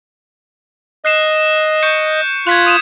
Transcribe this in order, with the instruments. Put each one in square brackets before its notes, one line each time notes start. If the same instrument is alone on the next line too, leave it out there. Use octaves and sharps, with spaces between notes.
[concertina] D#5 [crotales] F#6 C7 E7
[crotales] C#6 G6 C#7
[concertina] F4 F#6 [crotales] G#6 B6 F7
[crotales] D#6 D#7 E7